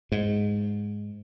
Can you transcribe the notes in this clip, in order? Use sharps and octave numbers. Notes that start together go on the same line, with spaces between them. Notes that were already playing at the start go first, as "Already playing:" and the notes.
G#2